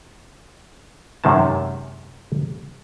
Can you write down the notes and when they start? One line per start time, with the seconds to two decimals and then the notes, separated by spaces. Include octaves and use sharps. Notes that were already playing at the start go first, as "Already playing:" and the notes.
1.24 F#2 C3 D#3 G#3 A5